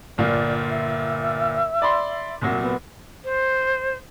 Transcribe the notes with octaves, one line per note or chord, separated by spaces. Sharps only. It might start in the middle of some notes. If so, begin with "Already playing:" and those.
G1 A#2 F4 D5
E5
D5 B5 C6
C2 A#2 F#3
B3
C5